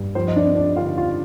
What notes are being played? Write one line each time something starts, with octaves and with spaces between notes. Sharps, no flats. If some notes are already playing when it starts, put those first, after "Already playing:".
Already playing: G2
F3 C5
D#5
D4 D5
C4
D4 D5
D3 F4 F5
F4 F5